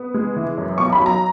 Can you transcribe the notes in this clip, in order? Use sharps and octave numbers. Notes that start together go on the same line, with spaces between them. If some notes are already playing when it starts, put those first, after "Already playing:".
Already playing: B3
G#3
E3
F#2
B1 C#6
B5
F#3
A#5